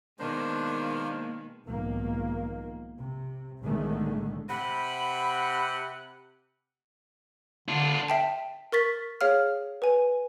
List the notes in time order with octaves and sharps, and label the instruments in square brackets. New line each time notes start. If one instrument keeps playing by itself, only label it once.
[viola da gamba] B2 D#3 G#3 [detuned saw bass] A#3 [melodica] D4 C5
[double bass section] B1 G#2 D#3 F3 A#3
C3
B1 A2 D3 D#3 G#3 A3
[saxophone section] C3 F#5 [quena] B5
[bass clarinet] D3 [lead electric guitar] D4 F4
[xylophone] E5 G5 A5
A#4 C#6 A6 B6
G#4 C#5 F5 F6
B4 G#5